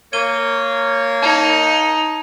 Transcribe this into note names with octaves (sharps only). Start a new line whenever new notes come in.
A#3 C#5 G#6 D#7 G7
D#4 A5 G#6